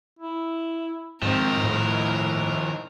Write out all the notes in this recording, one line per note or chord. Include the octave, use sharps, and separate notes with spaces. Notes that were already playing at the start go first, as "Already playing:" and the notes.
E4
G#2 D#3 F3 C4 A#4
A2 E4